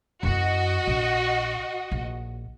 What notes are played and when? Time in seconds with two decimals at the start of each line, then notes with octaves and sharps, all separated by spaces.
0.23 F#2 E4 F#4 D#5
0.87 A#1
1.91 A#1